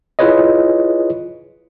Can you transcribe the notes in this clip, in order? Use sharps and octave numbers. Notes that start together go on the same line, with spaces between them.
E4 F4 G#4 B4 C#5 D#5